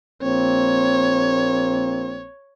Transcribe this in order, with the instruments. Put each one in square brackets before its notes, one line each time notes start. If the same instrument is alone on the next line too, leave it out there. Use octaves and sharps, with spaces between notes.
[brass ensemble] A#1 A#3 C4 [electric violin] C#5